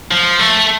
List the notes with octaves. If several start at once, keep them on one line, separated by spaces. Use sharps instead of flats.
F3
A3